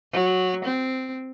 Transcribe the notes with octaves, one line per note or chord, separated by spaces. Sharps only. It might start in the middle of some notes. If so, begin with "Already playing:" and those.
F#3
C4